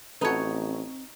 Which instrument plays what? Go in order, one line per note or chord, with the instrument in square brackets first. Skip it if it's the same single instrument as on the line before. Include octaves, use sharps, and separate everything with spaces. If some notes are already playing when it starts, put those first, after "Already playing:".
[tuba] A1 [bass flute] C4 [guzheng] D#4 C#5 [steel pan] F#4 A4 B4